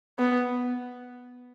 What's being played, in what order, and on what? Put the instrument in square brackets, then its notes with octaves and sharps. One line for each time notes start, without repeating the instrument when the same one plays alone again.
[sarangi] B3